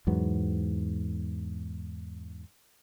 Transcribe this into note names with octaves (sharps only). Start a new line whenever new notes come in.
E2 G#2 F#3 B3